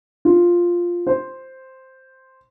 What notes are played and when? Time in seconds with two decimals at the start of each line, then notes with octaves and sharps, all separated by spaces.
0.25 F4
1.07 C5